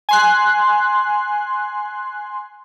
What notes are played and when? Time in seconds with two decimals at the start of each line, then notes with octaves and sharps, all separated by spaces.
0.09 G#5 C6 F#6